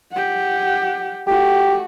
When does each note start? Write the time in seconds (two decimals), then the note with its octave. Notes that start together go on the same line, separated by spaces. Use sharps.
0.12 G4 F#5
1.27 A3 F#4 G4